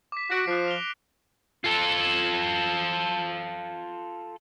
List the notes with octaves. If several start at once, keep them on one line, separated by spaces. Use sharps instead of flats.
D6 B6
F#4 A#6 D7
F3 F#6 C7
F7 G7
F4 A4